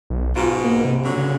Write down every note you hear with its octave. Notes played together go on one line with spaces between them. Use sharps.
B1
G#2 B2 F4
A#3
C3
A#2 D3 F#3
C#3